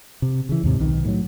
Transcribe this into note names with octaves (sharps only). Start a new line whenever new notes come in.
C3
C#3 E3
D#2 G#2 C3
B1 D#3
A2 F#3